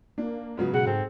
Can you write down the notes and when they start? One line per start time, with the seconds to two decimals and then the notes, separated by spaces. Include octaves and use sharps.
0.18 A#3 D4
0.57 G#2 C#3 F#3 B3
0.74 B2 G#4 F#5
0.86 G#2 C4 A4